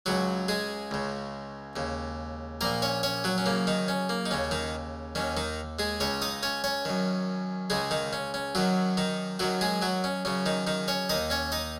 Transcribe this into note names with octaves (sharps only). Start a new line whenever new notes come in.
C#2 C#3 F#3 F#4
G#3 G#4
C#2 C#3
D#2 C#3
A#1 A#2 A#3 A#4
C#4 C#5
C#4 C#5
F#3 F#4
C#4
F#2 C#3 A#3
D#3 D#4
C#4
A#3
D#4
D#2 C#3 C#4
D#3 D#4
D#2 D#3 C#4
D#3 D#4
G#3 G#4
C#2 C#3 C#4 C#5
D#4 D#5
C#4 C#5
C#4 C#5
F#2 D#3
C#2 C#3 G#3 G#4
D#3 D#4
C#4
C#4
F#2 D#3 F#3 F#4
D#3 D#4
F#2 D#3 F#3 F#4
G#3 G#4
F#3 F#4
C#4
F#2 C#3 C#4
D#3 D#4
D#3 D#4
C#4 C#5
D#2 D#3 D#4 D#5
C#4 C#5
D#4 D#5